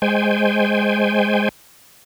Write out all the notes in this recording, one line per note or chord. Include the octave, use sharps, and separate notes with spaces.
G#3 C5 G5 G#5